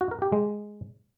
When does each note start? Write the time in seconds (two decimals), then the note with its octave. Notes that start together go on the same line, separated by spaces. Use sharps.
0.01 F#4
0.11 A#4
0.22 G4
0.32 G#3